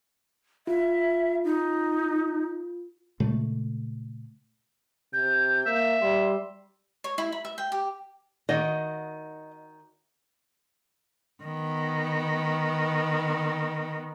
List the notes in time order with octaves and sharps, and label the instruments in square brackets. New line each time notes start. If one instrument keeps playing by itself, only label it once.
[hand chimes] F4 [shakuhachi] E5
[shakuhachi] D#4
[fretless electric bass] A#2 C#3 G#3 A3
[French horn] C3 [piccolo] G6
[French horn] A#3 [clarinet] E5
[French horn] G3 [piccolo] C6
[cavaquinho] C#5
E4
B5
E5
G5
G4
[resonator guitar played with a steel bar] D#3 F#4 [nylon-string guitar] D#5
[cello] D#3 B3